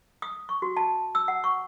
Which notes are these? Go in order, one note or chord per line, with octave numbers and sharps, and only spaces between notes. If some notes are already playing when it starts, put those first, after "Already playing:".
D#6
C#6
F#4
A5
E6
F#5
C#6